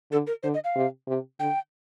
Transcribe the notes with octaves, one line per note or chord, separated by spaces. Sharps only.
D3 A4
A#4
D3 C5
D#5
F5
C3
C3
D3 G5